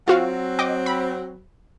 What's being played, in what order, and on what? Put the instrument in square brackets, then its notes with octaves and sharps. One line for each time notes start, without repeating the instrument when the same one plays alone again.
[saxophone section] F#3 C4 [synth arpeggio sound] F4 F#4 F5
[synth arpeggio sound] D#5 G5 D6
B5